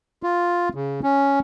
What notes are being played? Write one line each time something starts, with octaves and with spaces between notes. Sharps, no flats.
F4
C#3
C#4